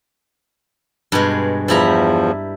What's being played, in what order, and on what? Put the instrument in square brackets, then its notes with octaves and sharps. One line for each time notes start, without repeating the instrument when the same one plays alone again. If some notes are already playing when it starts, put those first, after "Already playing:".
[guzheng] G2 B2 G#3
[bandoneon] E2 F3 [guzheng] G3 E4 A#5